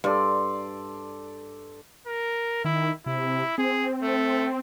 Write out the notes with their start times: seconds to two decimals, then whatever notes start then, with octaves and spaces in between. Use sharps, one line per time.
0.04 G2 A4 D5 C6
2.07 A#4
2.65 D#3 E4
3.06 C3 E4
3.58 C4 G#4
4.02 A3